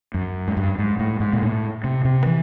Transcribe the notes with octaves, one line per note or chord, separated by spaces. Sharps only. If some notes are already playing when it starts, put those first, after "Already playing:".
F#2
G#2
G2
G#2
A2
G#2
A#2
A2
C3
C3
E3